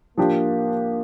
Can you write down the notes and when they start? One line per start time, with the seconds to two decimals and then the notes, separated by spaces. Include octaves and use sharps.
0.18 F3 A#3 D4 G4